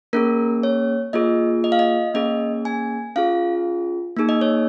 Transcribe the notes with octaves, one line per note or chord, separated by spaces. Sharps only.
A#3 C#4 G#4 A#4
C#5
A#3 F4 G#4 D#5
D#5
F5
D#5
A#3 C#4 G#4 D#5
G#5
C#4 F4 G#4 F5
A#3 D#4 G#4
D#5
C#5